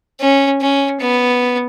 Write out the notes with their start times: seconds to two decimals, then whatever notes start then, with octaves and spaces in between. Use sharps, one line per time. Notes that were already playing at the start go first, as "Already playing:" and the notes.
0.20 C#4
0.61 C#4
1.00 B3